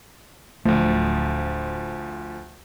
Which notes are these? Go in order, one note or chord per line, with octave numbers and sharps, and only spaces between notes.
D1 D2 F3 A3